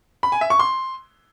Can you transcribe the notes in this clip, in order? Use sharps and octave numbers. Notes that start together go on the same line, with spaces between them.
B5
G#5
E5
C#6
C6